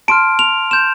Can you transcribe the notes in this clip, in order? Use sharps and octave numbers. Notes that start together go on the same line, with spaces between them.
A5 C6 F6 D7
F7
C6 G6 E7